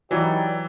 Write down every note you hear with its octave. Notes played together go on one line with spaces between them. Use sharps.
E3 F#3 D#4 G4 B4 D5